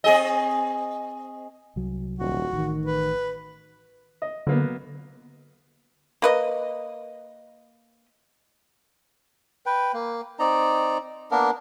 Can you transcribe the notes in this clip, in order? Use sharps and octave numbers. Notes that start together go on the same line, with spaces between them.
C4 G#4 D#5
C2 F#3
D#1 F#4
A1 D#3
B4
D#5
D3 F#3 A#3 B3
A#3 B4 D#5
B4 G5
A#3
C4 D#4 D5 A#5
A#3 B3 D4 A#4